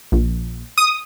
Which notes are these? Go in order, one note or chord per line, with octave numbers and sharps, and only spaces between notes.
A#1
D#6